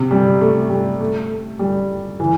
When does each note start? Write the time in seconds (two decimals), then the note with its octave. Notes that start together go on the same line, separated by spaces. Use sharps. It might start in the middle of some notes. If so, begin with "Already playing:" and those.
Already playing: C3
0.11 G3
0.41 A3
0.70 G3
1.00 A3
1.59 G3
2.20 E3